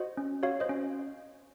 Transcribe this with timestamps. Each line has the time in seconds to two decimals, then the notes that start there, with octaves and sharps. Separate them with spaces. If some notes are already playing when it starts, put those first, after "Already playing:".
Already playing: F#4 C5 D#5
0.17 C#4
0.43 F#4 C#5 F5
0.60 C5 D#5
0.69 C#4